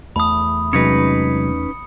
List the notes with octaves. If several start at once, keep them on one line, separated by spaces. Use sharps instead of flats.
E2 A3 B5 D#6
C3 F#3 G#3 C#4 D#4 B4 C#7